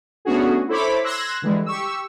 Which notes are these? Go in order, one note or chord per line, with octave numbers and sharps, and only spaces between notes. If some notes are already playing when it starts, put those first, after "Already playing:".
A3 B3 C#4 D4 F#4 G#4
E4 A4 C5 C#5 B5 D6
C6 E6 F#6 G#6 A#6
D3 E3 G3 G#3
G4 C#6 E6